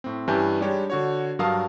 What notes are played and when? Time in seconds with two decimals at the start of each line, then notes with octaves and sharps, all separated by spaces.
0.04 A2 C4
0.28 G2 E3 C#4 G4 G#5 G6
0.60 G3 G#3 D4 D#4 G4 C#5
0.90 D3 F#4 C#5
1.39 G2 F#3 A#4 F5 A5 D#6